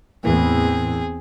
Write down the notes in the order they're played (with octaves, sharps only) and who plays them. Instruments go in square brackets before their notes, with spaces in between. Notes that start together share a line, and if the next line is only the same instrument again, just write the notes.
[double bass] E2 C4 [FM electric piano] A2 E3 A#3 [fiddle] G#4